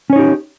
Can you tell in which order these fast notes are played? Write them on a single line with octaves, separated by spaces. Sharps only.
C#4 C#5 D#4 G4